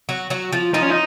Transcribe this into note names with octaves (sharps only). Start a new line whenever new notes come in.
F#3 F#4
F#3 F#4
F3 F4
F3 D#4 F4
C#4
D#4